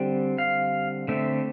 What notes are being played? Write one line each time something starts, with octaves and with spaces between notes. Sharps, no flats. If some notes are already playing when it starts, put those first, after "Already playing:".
Already playing: D3 G3 C4
F5
D3 A3 C4 E5